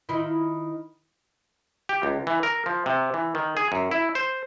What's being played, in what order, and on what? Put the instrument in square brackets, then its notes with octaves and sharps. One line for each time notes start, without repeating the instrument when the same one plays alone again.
[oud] D#3 E4 F4
[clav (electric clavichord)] G4
C#2
E3
A#4
F3
C3
E3
D#3
G#4
F#2
E4
C5